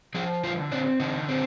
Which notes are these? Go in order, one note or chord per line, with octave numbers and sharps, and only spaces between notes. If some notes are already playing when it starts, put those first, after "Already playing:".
F3 G#4
D3 F4
C4 D4
D3 D#4
C4